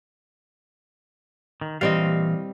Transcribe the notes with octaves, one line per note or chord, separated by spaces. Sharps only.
D#3
A#2 E3 G3 C4 D#5 F5